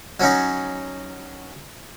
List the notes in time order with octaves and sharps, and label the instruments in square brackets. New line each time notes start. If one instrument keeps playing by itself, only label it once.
[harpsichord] F#3 C#4 D#4